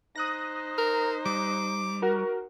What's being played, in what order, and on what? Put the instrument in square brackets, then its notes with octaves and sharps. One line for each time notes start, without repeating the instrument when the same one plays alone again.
[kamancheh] D#4 C5 [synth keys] D#6 F#6 A#6
[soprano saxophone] A#4
[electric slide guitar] G3 [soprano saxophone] D6
[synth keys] F#4 A#4